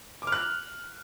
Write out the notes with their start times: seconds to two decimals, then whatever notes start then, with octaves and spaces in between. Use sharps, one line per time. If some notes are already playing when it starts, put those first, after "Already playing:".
0.22 D6
0.27 F6
0.32 F#6